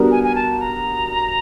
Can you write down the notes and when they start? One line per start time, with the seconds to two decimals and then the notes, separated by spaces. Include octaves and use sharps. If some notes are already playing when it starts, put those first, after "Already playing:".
Already playing: G3 B3 D4 F#4 A#4
0.11 G#5
0.24 G#5
0.35 A5
0.60 A#5